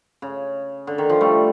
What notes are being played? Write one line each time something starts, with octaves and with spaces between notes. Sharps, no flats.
C#3
D3
D#3
F3
G3 A3